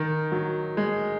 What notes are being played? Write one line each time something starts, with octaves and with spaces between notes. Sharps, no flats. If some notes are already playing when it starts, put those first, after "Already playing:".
Already playing: D#3
F#3
G#3